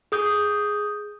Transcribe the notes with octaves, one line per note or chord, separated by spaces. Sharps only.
G#4 D#6 G6